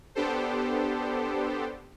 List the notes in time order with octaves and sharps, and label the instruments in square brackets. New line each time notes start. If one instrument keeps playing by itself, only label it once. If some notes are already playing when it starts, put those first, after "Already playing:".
[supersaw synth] B3 D4 G4 A4 C5